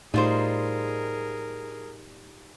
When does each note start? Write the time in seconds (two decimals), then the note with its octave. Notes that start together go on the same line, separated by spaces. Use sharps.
0.14 A2 G3 D#4 F4 G#4 A#4 C5